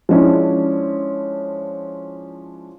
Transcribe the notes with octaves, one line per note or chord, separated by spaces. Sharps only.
F3 G#3 C#4 D4 E4